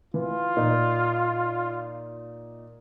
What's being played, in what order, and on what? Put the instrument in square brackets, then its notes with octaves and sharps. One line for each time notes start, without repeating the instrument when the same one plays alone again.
[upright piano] E3 [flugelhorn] F4
[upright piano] A#2 D#4